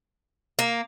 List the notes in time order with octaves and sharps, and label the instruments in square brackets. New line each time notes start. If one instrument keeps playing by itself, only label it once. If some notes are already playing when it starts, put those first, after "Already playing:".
[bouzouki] A#3